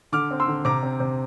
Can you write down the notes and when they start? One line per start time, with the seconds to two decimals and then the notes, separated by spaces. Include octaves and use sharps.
0.12 D3 D6 F6
0.31 C4
0.40 C6 E6
0.47 D3
0.65 C3 A#5 D6
0.83 C4
1.00 C3